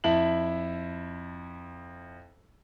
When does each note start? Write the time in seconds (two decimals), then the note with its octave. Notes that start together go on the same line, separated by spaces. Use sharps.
0.04 F2 E4 E5 A5 F#7